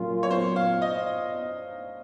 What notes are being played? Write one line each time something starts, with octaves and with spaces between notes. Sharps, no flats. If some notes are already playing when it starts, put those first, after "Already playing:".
Already playing: A#2 F#3 C#4 F4
C#5
C5
F5
D#5